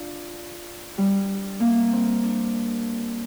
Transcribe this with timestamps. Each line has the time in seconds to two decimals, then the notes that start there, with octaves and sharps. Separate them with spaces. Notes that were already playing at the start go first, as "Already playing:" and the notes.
Already playing: D4 F4
0.98 G3
1.60 A#3
1.92 C4
2.23 D4